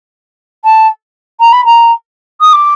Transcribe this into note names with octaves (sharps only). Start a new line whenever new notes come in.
A5
A#5
B5
A#5
D#6
D6